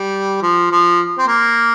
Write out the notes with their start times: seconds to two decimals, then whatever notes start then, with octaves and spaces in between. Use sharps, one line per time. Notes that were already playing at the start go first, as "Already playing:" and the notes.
Already playing: G3
0.42 F3
0.71 F3
1.18 C4
1.27 A#3